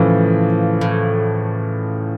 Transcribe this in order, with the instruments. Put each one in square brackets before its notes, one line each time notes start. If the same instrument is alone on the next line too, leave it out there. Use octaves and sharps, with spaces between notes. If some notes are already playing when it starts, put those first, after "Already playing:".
Already playing: [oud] A2 [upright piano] C#3 E3 F3
[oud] A2